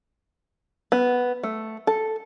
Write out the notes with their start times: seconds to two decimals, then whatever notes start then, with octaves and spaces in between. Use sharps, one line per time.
0.92 B3
1.43 A3
1.87 A4